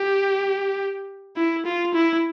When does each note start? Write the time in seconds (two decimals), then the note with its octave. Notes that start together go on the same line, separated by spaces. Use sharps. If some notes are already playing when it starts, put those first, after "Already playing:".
Already playing: G4
1.36 E4
1.65 F4
1.94 E4